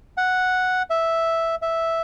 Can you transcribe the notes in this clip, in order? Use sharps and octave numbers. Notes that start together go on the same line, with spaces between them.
F#5
E5
E5